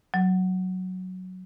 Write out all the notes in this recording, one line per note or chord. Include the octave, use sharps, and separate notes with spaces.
F#3